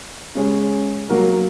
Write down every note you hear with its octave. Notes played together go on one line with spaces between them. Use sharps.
C#3 G#3 C#4 G#4
F#3 A#3 F#4 A#4